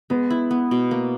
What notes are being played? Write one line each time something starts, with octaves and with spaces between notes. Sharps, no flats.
G#3 B3
E4
B3
B2
A#3